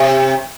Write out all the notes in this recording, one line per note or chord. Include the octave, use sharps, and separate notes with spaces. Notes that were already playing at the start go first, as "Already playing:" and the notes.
Already playing: C3